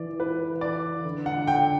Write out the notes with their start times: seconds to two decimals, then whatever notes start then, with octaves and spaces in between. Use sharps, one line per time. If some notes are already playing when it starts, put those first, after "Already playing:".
Already playing: E3 D5
0.20 B4
0.61 D5
1.04 D3
1.26 F#5
1.47 G5